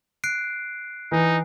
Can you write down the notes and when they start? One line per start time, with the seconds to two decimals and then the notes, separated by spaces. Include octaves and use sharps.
0.24 F#6 C7 D7
1.12 E3 D#4